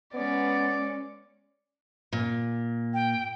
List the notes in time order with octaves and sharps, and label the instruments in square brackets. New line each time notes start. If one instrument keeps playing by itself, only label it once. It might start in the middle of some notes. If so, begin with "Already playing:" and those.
[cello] G#3 C#4 [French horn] B3 [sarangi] D5
[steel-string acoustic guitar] A#2
[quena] G5